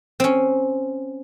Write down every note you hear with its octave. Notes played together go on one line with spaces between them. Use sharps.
C4 C#4